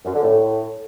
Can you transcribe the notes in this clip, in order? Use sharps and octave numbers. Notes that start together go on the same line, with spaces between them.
F#2
D3
A2